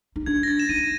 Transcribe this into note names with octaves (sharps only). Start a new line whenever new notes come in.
D#4
D4 G#6
A#6
A6
E7
D#4 D#7